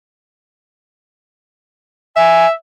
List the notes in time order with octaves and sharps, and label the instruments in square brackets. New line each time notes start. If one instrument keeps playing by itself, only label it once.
[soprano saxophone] E5 [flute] G#5